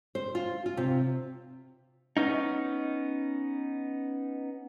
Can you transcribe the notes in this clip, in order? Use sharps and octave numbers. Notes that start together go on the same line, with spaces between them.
C5
F4
F4
C3
B3 C#4 D#4